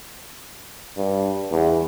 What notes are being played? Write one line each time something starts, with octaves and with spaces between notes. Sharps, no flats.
G2
E2